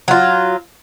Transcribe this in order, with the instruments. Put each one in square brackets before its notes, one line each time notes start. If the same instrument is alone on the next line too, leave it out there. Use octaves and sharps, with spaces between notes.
[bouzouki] F#3 F4